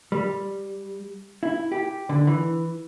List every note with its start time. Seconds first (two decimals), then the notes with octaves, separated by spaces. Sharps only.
0.12 G3
1.43 E4
1.72 G4
2.09 D3
2.27 E3